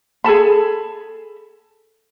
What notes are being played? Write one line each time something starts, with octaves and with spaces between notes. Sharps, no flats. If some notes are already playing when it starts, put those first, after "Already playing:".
G#4 A4 A5 B5